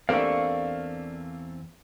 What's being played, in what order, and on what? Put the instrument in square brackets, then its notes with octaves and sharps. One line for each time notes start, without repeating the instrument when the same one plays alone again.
[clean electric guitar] E2 C4 [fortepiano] A3 A#3 [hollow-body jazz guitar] D4 G4 [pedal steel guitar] F5 C#6